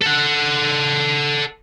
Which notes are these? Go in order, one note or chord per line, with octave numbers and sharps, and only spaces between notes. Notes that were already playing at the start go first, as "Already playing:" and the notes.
A4 F#5